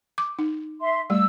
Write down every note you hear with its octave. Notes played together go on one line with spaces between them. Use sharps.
D6
D#4
E5 C6
G3 A3 E6